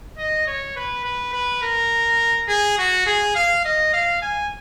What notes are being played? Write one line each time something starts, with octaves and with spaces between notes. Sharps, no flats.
D#5
C#5
B4
B4
B4
A#4
G#4
F#4
G#4
F5
D#5
F5
G#5